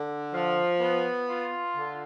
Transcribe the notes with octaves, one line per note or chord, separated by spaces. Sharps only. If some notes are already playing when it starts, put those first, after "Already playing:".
Already playing: D3
F3
B3
F4
D3